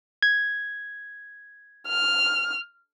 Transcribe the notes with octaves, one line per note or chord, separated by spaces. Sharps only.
G#6
F6